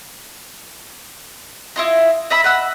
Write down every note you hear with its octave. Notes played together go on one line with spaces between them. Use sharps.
E4 F4 D#5
D#5 E5 B5
D#5 F#5 E6